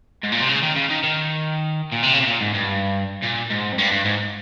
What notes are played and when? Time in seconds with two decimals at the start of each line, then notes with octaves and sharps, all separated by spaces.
0.23 G#2
0.32 A#2
0.40 C3
0.48 C#3
0.62 D#3
0.76 C#3
0.90 D#3
1.03 D#3
1.92 A#2
2.03 C3
2.13 C#3
2.20 C3
2.27 A#2
2.41 G#2
2.54 G2
3.23 A#2
3.50 G#2
3.73 F2
3.78 G2
3.92 G2
4.05 G#2